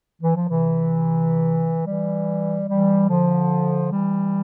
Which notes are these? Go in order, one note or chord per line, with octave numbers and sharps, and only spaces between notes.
E3
F3
C3 E3
E3 G3
E3 G3
D3 F3
E3 G3